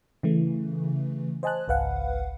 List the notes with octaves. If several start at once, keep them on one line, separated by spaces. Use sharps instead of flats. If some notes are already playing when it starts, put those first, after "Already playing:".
C#3 E3 A3
C5 D#5 G#5 A5 F#6
G#1 C#2 B4 F5 F#5